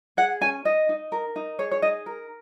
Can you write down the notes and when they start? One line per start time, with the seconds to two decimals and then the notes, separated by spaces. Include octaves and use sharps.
0.17 G#4 F#5
0.41 C#4 G#5
0.65 D#4 D#5
0.89 D#4
1.12 A#4
1.36 D#4
1.59 G#4 C#5
1.72 C#5
1.82 D#4 D#5
2.06 A#4